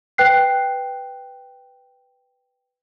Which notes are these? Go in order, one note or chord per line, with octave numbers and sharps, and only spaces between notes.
B4 G5 F#6 C7